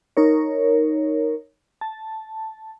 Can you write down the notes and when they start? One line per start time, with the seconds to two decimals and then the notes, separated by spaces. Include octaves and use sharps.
0.17 D#4 A#4 C#5
1.81 A5